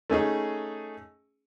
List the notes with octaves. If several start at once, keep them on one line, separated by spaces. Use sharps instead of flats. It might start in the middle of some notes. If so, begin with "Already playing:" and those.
A3 C#4 D#4 G#4